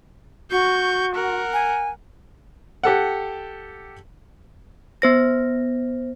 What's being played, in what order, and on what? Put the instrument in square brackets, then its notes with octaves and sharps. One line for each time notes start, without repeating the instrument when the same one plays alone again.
[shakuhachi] F#4 [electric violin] C#6 G6
[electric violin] A#4 F#5
[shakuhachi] G#5
[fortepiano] G4 A4 F#5
[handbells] B3 C5 A#6